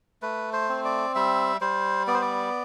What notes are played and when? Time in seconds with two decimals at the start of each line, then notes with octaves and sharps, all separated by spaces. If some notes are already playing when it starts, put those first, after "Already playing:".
0.22 A3 B4
0.53 C5
0.69 C4
0.85 D5
1.15 G3 E5
1.61 G3 C5
2.07 B3 D5
2.14 C5
2.22 D5